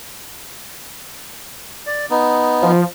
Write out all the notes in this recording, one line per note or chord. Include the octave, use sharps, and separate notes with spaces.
D5
B3 D#4
F3